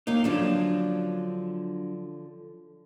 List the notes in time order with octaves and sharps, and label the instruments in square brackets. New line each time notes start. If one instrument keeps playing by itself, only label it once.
[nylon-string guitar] D#2 A#3 [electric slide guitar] D#4
[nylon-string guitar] D3 F3 C#4 [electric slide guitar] F#3 D4